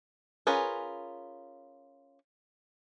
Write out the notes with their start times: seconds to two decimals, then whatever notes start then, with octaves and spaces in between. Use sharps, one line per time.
0.47 C#4 F4 G#4 A#4 B4